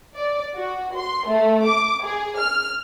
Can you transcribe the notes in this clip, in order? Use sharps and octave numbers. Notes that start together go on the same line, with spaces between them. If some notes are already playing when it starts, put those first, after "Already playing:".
D5
F#4
C6
A3
D6
G#4
F6